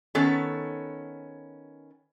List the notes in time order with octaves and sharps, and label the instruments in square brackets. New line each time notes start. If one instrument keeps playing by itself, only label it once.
[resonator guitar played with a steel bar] D#3 B3 C#4 A4